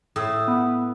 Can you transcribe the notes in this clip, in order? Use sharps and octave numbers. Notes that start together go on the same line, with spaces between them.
A2 D#6 E6
B3